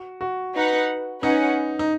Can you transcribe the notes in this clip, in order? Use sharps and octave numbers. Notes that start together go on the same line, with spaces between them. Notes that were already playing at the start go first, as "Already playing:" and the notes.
Already playing: F#4
F#4
D#4 B4 F#5
C#4 D#4 B4 F#5
D#4